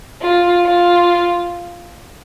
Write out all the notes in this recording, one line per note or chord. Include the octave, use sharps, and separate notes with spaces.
F4
F4